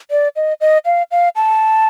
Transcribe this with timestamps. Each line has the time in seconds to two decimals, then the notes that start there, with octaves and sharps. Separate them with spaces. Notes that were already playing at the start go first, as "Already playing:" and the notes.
0.11 D5
0.36 D#5
0.61 D#5
0.85 F5
1.11 F5
1.36 A5